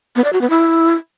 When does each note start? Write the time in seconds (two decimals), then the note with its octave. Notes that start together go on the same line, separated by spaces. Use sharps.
0.16 B3
0.24 D5
0.33 F#4
0.41 B3
0.50 E4